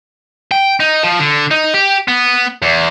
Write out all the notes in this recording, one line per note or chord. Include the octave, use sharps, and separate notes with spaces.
G5
D#4
F3
D3
D#4
G4
B3
E2